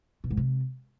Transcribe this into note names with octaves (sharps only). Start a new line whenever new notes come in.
B2
G#2
C3